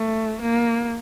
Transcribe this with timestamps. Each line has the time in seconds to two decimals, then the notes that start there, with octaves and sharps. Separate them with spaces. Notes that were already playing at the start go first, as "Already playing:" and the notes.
Already playing: A3
0.42 A#3